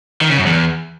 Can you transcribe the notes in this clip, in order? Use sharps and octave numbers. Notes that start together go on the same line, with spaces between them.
D#3
C#3
F#2
E2